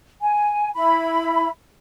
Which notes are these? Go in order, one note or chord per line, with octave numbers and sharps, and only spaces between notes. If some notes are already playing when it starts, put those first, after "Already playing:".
G#5
E4 B5